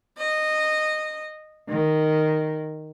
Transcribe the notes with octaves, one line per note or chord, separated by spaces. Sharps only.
D#5
D#3